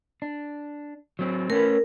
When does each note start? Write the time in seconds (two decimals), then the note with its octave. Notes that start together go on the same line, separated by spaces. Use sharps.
0.22 D4
1.19 F#3 C4
1.50 A3 C#4 A#4 B4